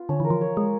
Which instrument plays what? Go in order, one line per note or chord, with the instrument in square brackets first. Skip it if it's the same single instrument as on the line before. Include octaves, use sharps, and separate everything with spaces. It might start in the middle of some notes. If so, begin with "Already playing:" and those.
Already playing: [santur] B3 F4
[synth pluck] D3 [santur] C#4
[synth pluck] E3 [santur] A#4
[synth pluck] F3
[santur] C#5
[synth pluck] G#3 [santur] C#5